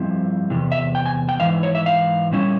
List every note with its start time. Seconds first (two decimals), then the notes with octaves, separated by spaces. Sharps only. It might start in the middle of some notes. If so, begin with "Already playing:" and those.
Already playing: G2 F3 C4 E4
0.50 E2 C3
0.72 E5
0.95 G5
1.06 G#5
1.29 G5
1.40 G#2 E3 E4 F5
1.63 C#5
1.75 E5
1.86 F5
2.31 A#2 G3 C#4 E4